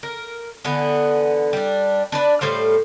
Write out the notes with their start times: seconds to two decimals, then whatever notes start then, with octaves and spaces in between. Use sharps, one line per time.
0.03 A#4
0.65 D3 E3 B3
1.53 G3 D4
2.12 D4 B4 D5
2.41 A2 G3 C5 F5